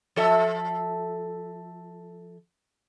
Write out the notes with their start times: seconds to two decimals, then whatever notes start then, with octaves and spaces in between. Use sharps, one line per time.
0.16 F3 A4 E5